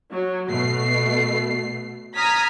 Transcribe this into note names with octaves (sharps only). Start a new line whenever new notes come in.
F#3
B2 A3 C7
A#5 D#6 F6 G#6 B6